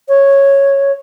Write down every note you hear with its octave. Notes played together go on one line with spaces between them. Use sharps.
C#5